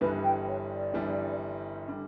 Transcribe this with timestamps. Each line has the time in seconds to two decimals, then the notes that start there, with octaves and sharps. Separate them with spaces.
0.01 G1 G2 E3 G3 B4
0.24 G5
0.47 C#5
0.70 D5
0.94 G1 G2 E3 G3
1.88 D3 G3